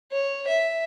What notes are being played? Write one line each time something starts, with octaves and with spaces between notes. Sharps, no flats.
C#5
E5